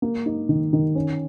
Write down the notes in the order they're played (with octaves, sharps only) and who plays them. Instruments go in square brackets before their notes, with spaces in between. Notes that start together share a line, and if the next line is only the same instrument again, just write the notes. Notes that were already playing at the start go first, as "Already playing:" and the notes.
[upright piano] A#3
D#4
D#3
D#3
C#4